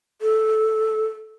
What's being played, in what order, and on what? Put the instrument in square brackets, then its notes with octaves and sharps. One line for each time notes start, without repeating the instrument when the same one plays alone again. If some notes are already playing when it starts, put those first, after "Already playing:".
[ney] A4